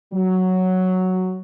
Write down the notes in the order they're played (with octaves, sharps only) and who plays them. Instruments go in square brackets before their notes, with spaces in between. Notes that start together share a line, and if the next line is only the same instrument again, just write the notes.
[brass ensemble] F#3